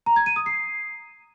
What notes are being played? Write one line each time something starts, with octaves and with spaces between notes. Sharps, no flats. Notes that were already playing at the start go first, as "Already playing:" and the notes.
A#5
G#6
D#7
D#6
C7